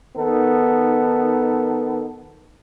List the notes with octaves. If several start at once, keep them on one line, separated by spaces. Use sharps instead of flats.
D#3 B3 D#4 A4